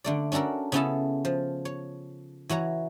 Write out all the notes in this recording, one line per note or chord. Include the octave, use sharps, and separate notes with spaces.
D3 A3 D5
C#4 D4 F#4 A4 A#4
C#3 B3 C#4 E4 A4 A5
F3
C#5
E3 F#4 C#5 A#5